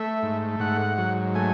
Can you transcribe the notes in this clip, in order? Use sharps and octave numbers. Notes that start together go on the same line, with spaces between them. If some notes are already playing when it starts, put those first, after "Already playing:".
Already playing: A3 E5
G#2
G#2 F#5
F#3
A3 G#5